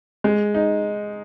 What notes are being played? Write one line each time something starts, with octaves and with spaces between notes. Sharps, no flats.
G#3
D#4